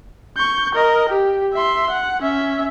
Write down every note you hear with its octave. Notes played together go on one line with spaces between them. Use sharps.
C#6 G6
A#4 D#5
G4
E5 C6
F#5
C#4 E5